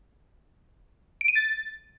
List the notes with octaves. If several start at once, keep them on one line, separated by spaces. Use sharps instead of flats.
D7
D#7
A6